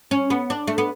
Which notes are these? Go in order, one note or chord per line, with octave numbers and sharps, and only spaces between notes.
C#4
B3
D4
A3
B3